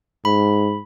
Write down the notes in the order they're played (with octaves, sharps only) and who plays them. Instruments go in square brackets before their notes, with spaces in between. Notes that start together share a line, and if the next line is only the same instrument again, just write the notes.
[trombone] G#2 [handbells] B5